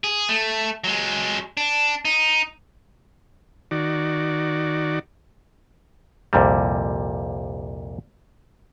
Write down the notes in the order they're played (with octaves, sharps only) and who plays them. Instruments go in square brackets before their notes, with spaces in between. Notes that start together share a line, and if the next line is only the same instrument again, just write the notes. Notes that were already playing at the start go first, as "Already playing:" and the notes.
[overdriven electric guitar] G#4
A3
F#3 G#3
D4
D#4
[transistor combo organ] D#3 F#4 D5
[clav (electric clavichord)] C2 F2 A#2 G3